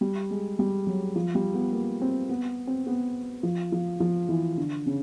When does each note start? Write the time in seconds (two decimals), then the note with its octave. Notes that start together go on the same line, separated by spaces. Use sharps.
0.01 G3
0.30 G#3
0.59 G3
0.87 F#3
1.16 F3
1.35 G3
1.54 B3
1.73 A#3
2.01 C4
2.29 B3
2.67 C4
2.87 B3
3.43 F3
3.72 F3
4.00 F3
4.29 E3
4.57 D3
4.86 C#3